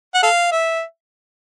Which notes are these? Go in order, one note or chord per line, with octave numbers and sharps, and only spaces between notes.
F#5
A4 F5
E5